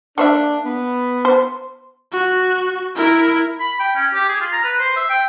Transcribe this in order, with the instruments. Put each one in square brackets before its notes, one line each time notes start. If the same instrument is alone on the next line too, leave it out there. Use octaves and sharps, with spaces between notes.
[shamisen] A#3 C5 E5 [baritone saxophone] D4
[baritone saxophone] B3
[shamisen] C5
[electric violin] F#4
E4 A#4
[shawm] B5
G5
C#4
G4
G#4
F4
A#5
B4
C5
E5
G5